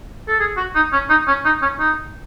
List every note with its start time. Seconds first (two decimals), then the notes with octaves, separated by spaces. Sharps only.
0.28 A4
0.40 G#4
0.57 F#4
0.75 D#4
0.93 C#4
1.10 D#4
1.27 C#4
1.45 D#4
1.62 C#4
1.79 D#4